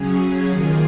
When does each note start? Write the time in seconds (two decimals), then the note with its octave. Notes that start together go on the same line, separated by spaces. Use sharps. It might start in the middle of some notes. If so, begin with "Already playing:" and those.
Already playing: C#3 F#3 C#4 G#4
0.49 D#3 A#3 F4 G#4